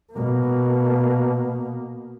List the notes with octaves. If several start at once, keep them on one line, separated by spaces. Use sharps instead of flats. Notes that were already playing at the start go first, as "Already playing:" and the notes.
B2 A#3